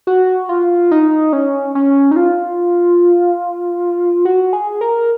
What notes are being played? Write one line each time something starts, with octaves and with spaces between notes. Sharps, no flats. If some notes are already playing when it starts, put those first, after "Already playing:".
F#4
F4
D#4
C#4
C#4
D#4
F4
F#4
G#4
A#4